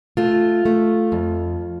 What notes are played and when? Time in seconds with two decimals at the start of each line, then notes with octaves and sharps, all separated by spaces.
0.17 A3 F4
0.65 A3
1.12 F2